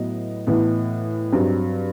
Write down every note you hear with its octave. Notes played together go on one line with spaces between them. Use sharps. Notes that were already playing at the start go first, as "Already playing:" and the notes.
Already playing: A2 F#3 B3 D#5
A2 E3 B3
G2 F#3 C4